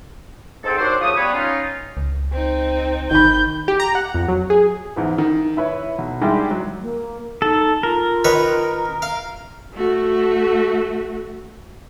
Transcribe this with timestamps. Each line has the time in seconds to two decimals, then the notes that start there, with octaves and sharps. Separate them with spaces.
0.64 G#2 C4 A4
0.78 D#2 F#3 D4 F#4 G4 C5
1.01 C#3 F3 A3 C#5 D#6
1.16 G3 B3 B4 C#5
1.33 C#4 D#4 F4
1.97 C#2
2.32 C4 D#4
3.11 G1 D#3 B5 G6
3.68 G4
3.80 A#5
3.95 F#5
4.14 F2
4.28 F#3
4.50 G#4
4.96 E2 G#2 E3
5.18 D#3
5.57 E4 B4 C#5
5.98 B1
6.21 D#3 G3 G#3 D4 E4 G4
6.51 F#3
6.81 A#3
7.42 D#4 A4
7.83 F4 A#4
8.24 D#3 B4 C#5
9.02 F5
9.74 A3 F#4